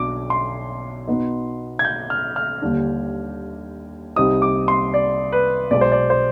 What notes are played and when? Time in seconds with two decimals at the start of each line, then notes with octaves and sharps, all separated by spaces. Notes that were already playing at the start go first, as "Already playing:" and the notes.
Already playing: B1 B2 D4 D6
0.30 C6
1.07 B2 B3 D#4
1.79 G#6
1.85 G6
2.10 F6
2.36 F6
2.62 D#2 D3 G3 D4
4.16 C2 C3 G3 C4 D#4 D#6
4.42 D6
4.68 C6
4.94 D5
5.32 B4
5.71 B1 B2 G#3 D5
5.81 C5
5.92 D5
6.10 C5